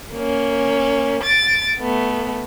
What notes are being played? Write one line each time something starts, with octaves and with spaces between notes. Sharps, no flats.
A#3 C#4
A6 D7
A3 B3